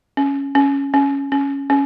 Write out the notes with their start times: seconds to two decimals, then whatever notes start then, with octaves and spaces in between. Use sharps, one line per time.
0.17 C#4
0.55 C#4
0.94 C#4
1.32 C#4
1.70 C#4